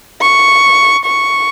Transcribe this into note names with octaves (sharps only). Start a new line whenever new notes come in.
C#6
C#6